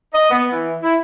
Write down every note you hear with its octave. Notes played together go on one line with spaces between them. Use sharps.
D#5
B3
E3
E4